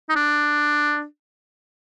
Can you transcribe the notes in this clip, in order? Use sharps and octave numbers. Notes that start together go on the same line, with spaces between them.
D#4
D4